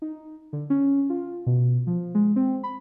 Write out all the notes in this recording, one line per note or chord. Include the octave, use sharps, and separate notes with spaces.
D#4
D3
C#4
F4
B2
F3
G#3
C4
B5